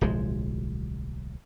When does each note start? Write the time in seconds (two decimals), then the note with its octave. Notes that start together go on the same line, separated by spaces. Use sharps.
0.01 D1 B1 F3 G#3